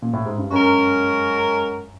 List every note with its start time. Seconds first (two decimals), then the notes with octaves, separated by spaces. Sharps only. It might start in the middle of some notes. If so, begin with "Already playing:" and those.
0.02 A#2
0.13 A2
0.26 G#2
0.38 G2
0.50 F#2 G#3 C#4 F#4 A#4